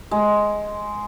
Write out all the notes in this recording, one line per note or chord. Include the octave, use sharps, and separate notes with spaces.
G#3